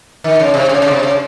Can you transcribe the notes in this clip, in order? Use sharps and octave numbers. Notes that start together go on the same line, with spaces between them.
D#3
C#3
C3
C#3
C#3
C3
C#3